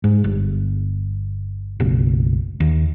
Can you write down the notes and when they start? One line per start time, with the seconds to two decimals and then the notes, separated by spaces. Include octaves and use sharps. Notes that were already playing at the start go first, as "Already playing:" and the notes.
0.04 G#2
0.24 G1
1.80 F#1 B1
2.60 D#2